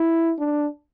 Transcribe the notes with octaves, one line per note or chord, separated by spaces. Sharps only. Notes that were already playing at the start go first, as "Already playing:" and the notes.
Already playing: E4
D4